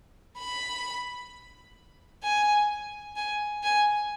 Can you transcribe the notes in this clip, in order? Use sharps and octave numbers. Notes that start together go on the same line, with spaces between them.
B5
G#5
G#5
G#5